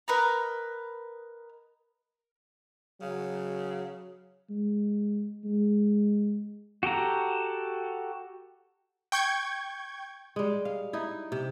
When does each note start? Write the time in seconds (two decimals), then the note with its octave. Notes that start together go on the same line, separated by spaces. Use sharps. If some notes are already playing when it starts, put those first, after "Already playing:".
0.08 A#4 B4 D#5 A#5
3.02 C#3 F#3
4.49 G#3
5.45 G#3
6.83 F#4 G4 A4 A#5
9.12 G5 C#6 G6 G#6
10.36 G3 G#3
10.65 F5
10.93 D#4 E4
11.32 C3